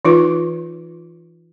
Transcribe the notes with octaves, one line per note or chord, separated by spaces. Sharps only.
E3 D#4 F4 B4